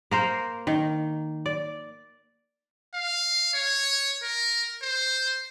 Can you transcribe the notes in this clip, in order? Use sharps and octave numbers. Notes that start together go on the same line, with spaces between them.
A#3 A#4 C5
D#3
D5
F5
C#5
A#4
C5